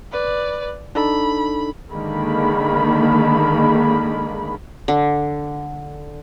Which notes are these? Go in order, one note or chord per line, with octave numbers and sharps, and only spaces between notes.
B4 D5
D4 D#4 A4 B5
D3 D#3 G#3 A#3 B5
D3